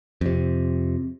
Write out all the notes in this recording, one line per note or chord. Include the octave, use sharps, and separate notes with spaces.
F2 C3